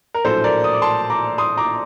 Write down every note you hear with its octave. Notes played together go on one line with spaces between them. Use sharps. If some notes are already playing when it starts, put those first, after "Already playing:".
A#4
A#1 A2 F#3 A4 C5
A#4 D5
D#6
D6
A5 C6
A#5 D6
C6 D#6
A#5 D6